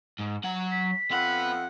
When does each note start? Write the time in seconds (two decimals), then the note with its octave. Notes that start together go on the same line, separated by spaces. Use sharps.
0.19 G#2
0.44 F#3 F#5
0.72 B6
1.11 F2 B3 E5 F#5 B5